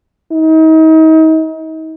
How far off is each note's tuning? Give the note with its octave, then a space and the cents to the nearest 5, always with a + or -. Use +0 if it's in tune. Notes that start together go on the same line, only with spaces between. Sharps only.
D#4 +35